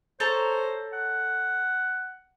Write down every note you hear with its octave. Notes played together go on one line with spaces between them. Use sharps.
A4 C5 C#5 A#5
F#5